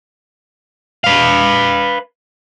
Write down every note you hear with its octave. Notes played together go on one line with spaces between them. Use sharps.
B4 F5